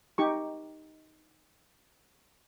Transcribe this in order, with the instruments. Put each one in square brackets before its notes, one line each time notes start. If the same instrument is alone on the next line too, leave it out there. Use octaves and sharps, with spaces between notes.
[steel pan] D#4 G4 C#6